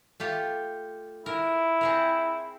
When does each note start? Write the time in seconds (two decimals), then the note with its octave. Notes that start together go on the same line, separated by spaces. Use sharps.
0.20 A3 F4 G4
1.26 E4 A#4
1.81 C4 G#4 A#4